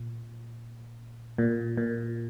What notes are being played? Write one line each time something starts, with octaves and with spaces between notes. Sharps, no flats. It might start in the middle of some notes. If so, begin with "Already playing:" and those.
Already playing: A#2
A#2
A#2